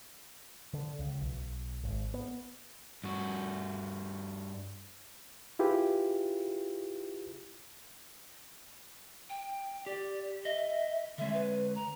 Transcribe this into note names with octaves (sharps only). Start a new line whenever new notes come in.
D3
C#2
B1
G#1
B3
G2 F#4
E4 F4 G4 G#4 B4
G5
G4 D5
D#5 E5
D3 G#3 E5
B4
A#5